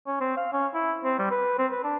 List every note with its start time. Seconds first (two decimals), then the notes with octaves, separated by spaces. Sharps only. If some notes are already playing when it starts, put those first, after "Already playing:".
0.07 C#4
0.21 C4
0.37 F5
0.53 C#4
0.74 E4
1.04 C4
1.19 G3
1.31 B4
1.58 C4
1.72 B4
1.84 D4